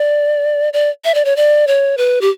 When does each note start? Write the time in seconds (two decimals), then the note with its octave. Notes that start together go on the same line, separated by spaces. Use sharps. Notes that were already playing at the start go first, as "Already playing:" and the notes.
Already playing: D5
0.73 D5
1.05 E5
1.14 D5
1.25 C#5
1.36 D5
1.67 C#5
1.97 B4
2.21 G4